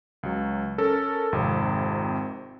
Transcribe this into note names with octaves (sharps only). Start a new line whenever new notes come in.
C#2 F#3
C#4 A4 A#4
G#1 F2 C3